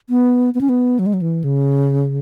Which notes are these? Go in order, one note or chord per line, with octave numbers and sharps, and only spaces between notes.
B3
B3
C#4
B3
F#3
G#3
F#3
E3
C#3